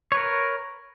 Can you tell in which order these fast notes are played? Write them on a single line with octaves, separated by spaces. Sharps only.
C#5 B4 A#4